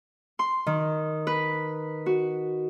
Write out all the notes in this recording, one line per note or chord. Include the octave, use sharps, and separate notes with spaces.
C6
D#3
B4
F#4